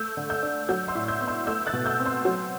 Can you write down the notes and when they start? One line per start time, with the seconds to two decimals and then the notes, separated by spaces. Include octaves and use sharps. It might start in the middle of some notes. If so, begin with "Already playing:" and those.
Already playing: A3 E6 G6
0.17 D3
0.30 E6 G6
0.43 D4
0.69 F#3 E6 G6
0.88 C6 E6
0.95 A2
1.08 E6 G6
1.21 B3
1.28 C6 E6
1.47 A3 E6 G6
1.66 F#6 A6
1.73 B2
1.86 E6 G6
2.00 C4
2.05 C6 E6
2.25 F#3